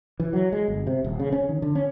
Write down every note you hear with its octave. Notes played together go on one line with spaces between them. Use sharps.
E3
F#3
G#3
G1
C3
D#1
C#3
C#4
D#3
D3
C#4